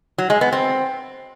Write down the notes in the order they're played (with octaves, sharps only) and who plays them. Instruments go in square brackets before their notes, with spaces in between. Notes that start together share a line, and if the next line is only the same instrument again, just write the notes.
[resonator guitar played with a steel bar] F#3
G#3
B3
C4